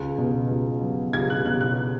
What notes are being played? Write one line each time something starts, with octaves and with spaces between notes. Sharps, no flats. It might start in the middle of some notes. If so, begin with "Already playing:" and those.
Already playing: C#2
B2
C#2
F#3
C#2 G#6
F#6
B2 F#6
F#6